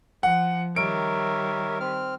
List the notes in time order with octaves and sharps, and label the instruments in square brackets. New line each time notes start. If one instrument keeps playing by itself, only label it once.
[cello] F3 [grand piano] F#5
[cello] D#3 G3 [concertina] A#4 C#5 E5 [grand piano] D7
[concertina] C4 F6